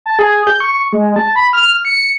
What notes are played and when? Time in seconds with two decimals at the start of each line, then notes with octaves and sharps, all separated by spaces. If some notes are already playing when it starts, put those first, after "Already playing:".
0.06 A5
0.19 G#4
0.47 G6
0.60 C#6
0.93 G#3
1.16 A5
1.36 B5
1.53 F6
1.85 C#7